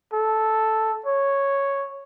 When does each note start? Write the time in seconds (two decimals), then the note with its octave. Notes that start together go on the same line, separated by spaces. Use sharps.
0.13 A4
1.06 C#5